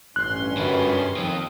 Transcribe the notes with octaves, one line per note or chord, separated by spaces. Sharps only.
A1 G2 C#4 C6 F#6
F#2 D3 B4
D#2 F3 C4 D#5